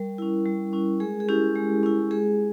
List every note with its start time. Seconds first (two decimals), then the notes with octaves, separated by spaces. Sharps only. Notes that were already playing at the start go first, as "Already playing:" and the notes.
Already playing: G3 A#4
0.18 C#4 E4
0.46 G3
0.73 C#4 E4
1.00 G#3 G#4
1.20 G#4
1.29 C#4 E4 G4
1.55 G#3
1.83 C#4 E4
2.11 G#3 G#4